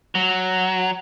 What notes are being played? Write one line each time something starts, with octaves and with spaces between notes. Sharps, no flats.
F#3